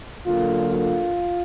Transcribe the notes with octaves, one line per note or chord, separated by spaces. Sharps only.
D3 F#3 A#3 F4
F4